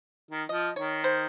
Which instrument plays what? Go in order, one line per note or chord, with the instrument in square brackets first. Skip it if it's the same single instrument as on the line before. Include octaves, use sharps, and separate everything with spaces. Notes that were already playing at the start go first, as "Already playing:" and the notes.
[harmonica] D#3
[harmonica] F3 [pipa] D#5
[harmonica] D#3 [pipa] C#5
[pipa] C5